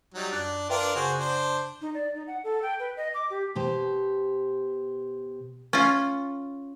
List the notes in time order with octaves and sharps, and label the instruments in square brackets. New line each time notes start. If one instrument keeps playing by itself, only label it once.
[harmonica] F#3 G3 D#4
[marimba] F#2 F#6 A6 [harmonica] D4
[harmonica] D4 F4 A#4 [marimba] B4 E5 G5
[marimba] C#3 [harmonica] F#4 G#4 C5
[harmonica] D4 C5
[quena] D#4
D5
D#4
F#5
A4
G5
B4
D#5
D6
G4
[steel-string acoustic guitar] B2 G4 C5
[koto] C#4 F4